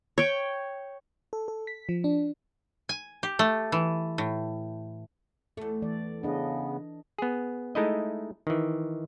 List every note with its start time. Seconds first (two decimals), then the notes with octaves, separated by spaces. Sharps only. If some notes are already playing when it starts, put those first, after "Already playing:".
0.18 C#5 G5
1.33 A4
1.48 A4
1.67 B6
1.89 F3
2.04 D4
2.89 G#5
3.23 G4
3.39 A3
3.72 E3
4.18 A2
5.57 E2 A3 A4
5.82 E3 D5
6.23 C#3 B3 D4 D#5
7.19 B3 G#4
7.75 G#3 A3 D#4 E4 D#5
8.47 D#3 E3